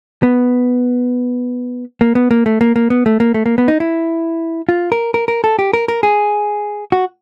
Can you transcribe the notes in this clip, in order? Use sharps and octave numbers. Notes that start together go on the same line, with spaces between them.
B3
A#3
B3
A#3
A3
A#3
A#3
B3
A3
A#3
A3
A#3
B3
D#4
E4
F4
A#4
A#4
A#4
A4
G4
A#4
A#4
G#4
F#4